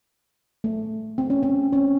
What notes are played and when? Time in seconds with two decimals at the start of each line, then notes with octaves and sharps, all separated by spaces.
0.64 A3
1.18 C4
1.30 C#4
1.43 C4
1.73 C#4